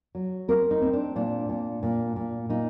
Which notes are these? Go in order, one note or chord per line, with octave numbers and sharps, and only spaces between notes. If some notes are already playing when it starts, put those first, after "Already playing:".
F#3
C4 A#4
D#4
C4
D4
A#2 D4
A#2
A#2
A#2
A#2 D#4